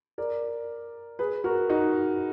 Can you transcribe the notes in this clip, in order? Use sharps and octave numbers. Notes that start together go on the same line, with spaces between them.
A#4 D5
G#4 B4
F#4 A#4
D#4 F#4